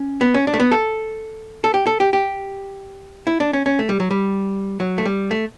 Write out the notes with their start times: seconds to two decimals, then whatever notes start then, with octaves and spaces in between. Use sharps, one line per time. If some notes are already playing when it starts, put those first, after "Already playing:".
Already playing: C#4
0.21 B3
0.34 C#4
0.47 D4
0.54 A3
0.60 B3
0.72 A4
1.64 A4
1.74 G4
1.87 A4
2.00 G4
2.13 G4
3.27 E4
3.40 D4
3.53 C#4
3.66 C#4
3.79 A3
3.89 G3
4.00 F#3
4.11 G3
4.80 F#3
4.98 A3
5.05 G3
5.31 A3